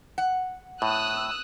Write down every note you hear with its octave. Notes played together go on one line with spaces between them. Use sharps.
F#5
A2 D#6 E6 F#6